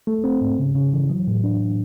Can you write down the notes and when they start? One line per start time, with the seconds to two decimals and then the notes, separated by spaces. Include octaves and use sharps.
0.07 A3
0.24 C4
0.41 G#2
0.59 C#3
0.75 C#3
0.94 E3
1.10 F#3
1.28 A2
1.44 D4